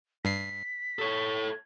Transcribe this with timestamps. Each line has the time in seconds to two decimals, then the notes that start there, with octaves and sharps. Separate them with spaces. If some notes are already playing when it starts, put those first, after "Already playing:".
0.25 G2 B6 C7
0.99 A4 C#5